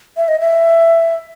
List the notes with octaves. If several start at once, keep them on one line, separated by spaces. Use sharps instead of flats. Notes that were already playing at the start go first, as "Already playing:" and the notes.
E5
D#5
E5